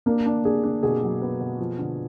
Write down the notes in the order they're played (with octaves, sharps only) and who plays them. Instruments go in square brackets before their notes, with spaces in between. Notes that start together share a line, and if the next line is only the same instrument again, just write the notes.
[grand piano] A#3 [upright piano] D4
[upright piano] D4
[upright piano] D4 [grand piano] G#4
[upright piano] D4
[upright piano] B2 [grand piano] G#4
[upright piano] F#3
B3
B2
F3
D3